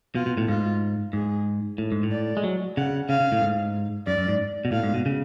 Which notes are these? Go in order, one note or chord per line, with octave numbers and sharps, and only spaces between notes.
B2 F4
B2
A2
G#2 F4
G#2 G#4
A2
G#2
A2
D5
G#3
F#3
C#3 F#5
C#3 F5
C#3
A2
G#2
F#2 D5
F#2
G#2
B2
A2 F5
G#2
B2
C#3